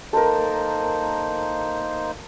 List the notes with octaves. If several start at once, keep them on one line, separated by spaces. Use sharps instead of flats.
A#3 D#4 A4 A#4 C5